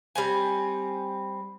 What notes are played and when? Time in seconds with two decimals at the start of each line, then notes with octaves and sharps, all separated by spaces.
0.15 G3 C4 G#5